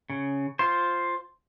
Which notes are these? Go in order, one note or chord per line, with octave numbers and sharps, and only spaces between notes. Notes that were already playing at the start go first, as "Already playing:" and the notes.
C#3
F4 C5